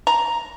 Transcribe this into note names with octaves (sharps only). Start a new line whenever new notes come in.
A#5